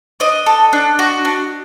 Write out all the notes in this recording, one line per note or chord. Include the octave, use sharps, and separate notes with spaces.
D4 D#5
A4
D4
F#4
D4